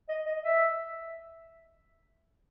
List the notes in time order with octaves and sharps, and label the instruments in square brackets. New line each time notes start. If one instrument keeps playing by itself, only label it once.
[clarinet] D#5
D#5
E5